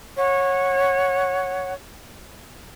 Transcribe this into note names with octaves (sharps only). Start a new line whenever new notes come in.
C#5 F#5